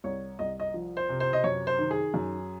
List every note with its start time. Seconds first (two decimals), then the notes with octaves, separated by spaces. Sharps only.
0.04 C2 C#5
0.39 C2 D#5
0.60 D#5
0.74 F3
0.97 C5
1.09 C3
1.20 C5
1.33 D#5
1.44 F#2 C#5
1.67 C5
1.79 D#3
1.91 G#4
2.14 F#2